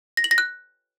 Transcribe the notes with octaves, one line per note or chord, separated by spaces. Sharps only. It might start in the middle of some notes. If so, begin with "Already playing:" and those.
A#6
F#7
A#6
F#6